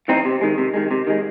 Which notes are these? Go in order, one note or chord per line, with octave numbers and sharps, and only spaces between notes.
E3 C4 D#4
C3
D#3 G#3
C3
D#3 G#3
C3
D#3 G#3